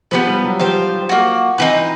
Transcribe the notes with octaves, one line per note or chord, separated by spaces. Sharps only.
F3 B3 D4 G4 B4
G3
F#3
F3 G4 C5 F5
A#3 D#4 F#4
E3 C4 D#4 G4 B4